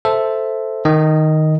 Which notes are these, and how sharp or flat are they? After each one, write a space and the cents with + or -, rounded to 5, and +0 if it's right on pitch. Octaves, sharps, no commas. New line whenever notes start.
A4 +0 C5 +0 E5 +0
D#3 +0 D#5 +0